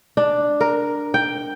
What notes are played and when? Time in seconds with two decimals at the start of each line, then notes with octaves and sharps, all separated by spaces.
0.17 D4
0.61 A#4
1.14 G5